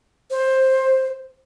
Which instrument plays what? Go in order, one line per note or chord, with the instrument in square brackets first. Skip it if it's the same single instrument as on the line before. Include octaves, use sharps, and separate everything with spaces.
[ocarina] C5